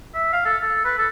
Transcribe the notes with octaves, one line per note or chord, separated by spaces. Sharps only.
E5
F5
A4
A4
B4
A4